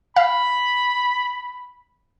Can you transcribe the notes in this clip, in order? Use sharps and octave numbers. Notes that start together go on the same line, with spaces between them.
F5 B5